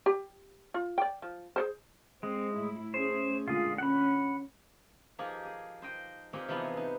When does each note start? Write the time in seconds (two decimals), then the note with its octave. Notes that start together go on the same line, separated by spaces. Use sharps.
0.06 G4
0.74 F4
0.98 D5 G5
1.22 F3
1.56 G#4 A4 C5
2.23 G#3 C4
2.54 A2 E4
2.94 A3 C#4 G#4 C5
3.48 A#2 D3 G#3 F4 G#4
3.78 C#4 F#5 B5
5.19 F3 A#3 D#4 G4 G#4
5.45 G#4
5.82 C5 D#5 G5
6.33 A#2 G#3 A#3 C4 G4 G#4
6.48 C3 E3 F3 B3 D#4 G#4
6.77 D#4